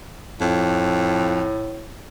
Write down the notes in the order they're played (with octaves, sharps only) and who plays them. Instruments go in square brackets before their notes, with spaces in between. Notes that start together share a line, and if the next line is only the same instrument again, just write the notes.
[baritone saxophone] F2 [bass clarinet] A2